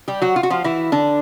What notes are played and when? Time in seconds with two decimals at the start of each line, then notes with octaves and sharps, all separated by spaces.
0.08 G3 G4
0.22 F#3 F#4
0.36 F4
0.43 F#4
0.50 F3 F4
0.64 E3 E4
0.92 D3 D4